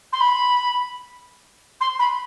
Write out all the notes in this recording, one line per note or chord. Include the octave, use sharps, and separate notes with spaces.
C6
B5
C6
B5